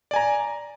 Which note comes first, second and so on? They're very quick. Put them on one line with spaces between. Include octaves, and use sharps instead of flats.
D5 G#5 A#5